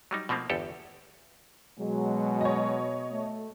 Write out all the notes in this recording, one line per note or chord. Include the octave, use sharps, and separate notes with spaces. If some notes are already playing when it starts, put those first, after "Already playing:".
F#3 G3 D#4
B2 F3 A3 A#3 C4
G1 E2 G4 A4
B2 F#3 G#3
C#5 D#5
A3